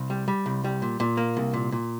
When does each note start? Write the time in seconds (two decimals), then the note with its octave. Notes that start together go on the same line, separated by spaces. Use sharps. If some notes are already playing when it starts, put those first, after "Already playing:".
Already playing: C2
0.10 G3
0.28 G3
0.46 C2
0.64 G3
0.82 A#2
1.00 A#2
1.17 A#3
1.37 C2
1.54 A#2
1.72 A#2